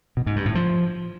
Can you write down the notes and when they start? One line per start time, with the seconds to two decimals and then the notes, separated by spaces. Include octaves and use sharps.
0.17 B2
0.26 G#2
0.36 G2
0.46 A2
0.55 F3